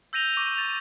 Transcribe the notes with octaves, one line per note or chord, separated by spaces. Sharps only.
E6 G6 A#6 D#7 F7 G7
C#6 D6 D#7
A6 F7